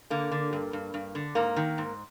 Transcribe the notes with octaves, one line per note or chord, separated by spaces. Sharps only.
D3 A#3
D3
G2
G2
G2
D3
G#2 A#3
D#3
G#2